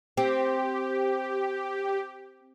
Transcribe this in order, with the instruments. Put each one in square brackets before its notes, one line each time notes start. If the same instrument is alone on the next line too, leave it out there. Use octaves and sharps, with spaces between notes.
[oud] C4 [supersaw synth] G4